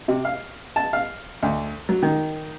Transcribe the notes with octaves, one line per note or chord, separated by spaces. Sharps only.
C3
F5
A5
F5
D2
F#3
D#3